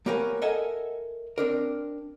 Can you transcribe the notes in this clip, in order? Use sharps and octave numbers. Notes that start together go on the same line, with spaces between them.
A#3 B3 G4 A#4 C#5 G#5
A4 A#4 D#5 E5 F#5 G#5
C4 D4 A#4